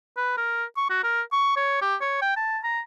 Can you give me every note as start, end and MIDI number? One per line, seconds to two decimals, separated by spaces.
0.17 0.34 71
0.37 0.65 70
0.77 0.88 85
0.90 1.02 66
1.04 1.21 70
1.32 1.53 85
1.56 1.76 73
1.82 1.96 67
2.01 2.20 73
2.22 2.34 79
2.36 2.59 81
2.64 2.80 82